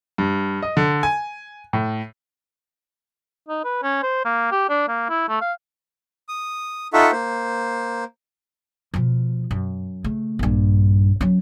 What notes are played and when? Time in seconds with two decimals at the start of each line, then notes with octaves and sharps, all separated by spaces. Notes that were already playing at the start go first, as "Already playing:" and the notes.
0.18 G2
0.62 D#5
0.77 D3
1.03 G#5
1.73 A2
3.48 D#4
3.64 B4
3.83 C#4
4.03 C5
4.25 A#3
4.52 G4
4.69 D4
4.88 A#3
5.09 E4
5.29 A3
5.41 F5
6.29 D#6
6.93 D#4 F4 A4 E5 F#5 C#6
7.12 A#3 C5
8.94 B2 F3
9.51 F#2
10.04 C#3 A3
10.39 A#1 G2
11.21 F#3 C#4